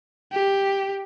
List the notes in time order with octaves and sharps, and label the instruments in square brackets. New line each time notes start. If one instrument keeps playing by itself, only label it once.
[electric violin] G4